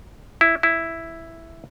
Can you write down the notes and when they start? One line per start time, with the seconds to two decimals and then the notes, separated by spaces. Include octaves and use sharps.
0.41 E4
0.63 E4